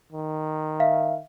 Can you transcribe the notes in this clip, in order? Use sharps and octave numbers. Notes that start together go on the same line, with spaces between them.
D#3
E5 F5